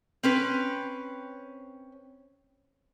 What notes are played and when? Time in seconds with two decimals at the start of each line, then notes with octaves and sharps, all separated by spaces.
0.23 C4 C#4 B4